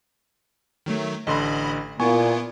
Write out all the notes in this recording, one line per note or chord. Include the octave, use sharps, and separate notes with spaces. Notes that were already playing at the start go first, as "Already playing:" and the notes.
D#3 F#3 A3
A1 D3 D#5 B5 C6
A#2 B3 E4 F4 G#5 C#6